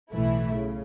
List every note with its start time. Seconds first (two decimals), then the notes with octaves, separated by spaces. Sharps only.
0.12 B1 A2 E3 A3 E4
0.54 C#3